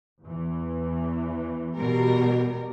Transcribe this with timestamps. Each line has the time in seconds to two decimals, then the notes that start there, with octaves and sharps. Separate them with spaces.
0.23 E2 E3
1.76 B2 G3 A#4